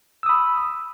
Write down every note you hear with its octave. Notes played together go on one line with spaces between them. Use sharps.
B5 D#6 E6